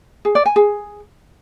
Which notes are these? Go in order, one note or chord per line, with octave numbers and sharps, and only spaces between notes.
G#4
D5
G#5
G#4